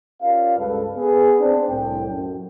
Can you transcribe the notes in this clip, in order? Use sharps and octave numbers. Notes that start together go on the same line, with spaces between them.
C#4 F4 G4 A#4 D5 F5
C#2 G2 A4 B4
B3 G#4 B4
C4 D4
C2 A2 G5
F#2